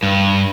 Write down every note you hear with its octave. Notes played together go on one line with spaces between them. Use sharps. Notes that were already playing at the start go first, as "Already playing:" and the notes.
G2